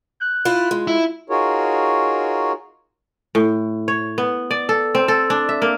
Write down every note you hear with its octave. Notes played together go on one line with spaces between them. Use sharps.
F#6 G6
E4 F4
G#3 F4
E4
D#4 F4 F#4 G#4 A#4 C#5
A2
C#5
B3
D5
A4
C4
A4
D4
E5
A#3